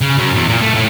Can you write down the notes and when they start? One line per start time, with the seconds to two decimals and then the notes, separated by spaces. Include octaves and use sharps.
0.01 C#3
0.18 F#2
0.35 E2
0.49 A#2
0.62 A3
0.75 A2